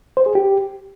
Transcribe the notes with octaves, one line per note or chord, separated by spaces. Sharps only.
C5
G#4
G4